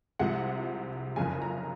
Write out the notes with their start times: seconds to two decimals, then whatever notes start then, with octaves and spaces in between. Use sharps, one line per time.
0.19 C2 C3 F3 G#3 F#5
1.16 F#1 F2 C#3 G#5
1.42 A#5